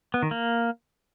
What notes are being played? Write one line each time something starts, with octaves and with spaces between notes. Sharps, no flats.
B3
D#3
A#3